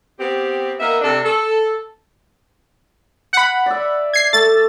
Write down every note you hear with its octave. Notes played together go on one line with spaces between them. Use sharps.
B3 C4 G4
A#3 B3 D#4 A#4 E5
C3 D4 A4
A4
F#5 B5
D5 E5
G#6 C7
A3 A6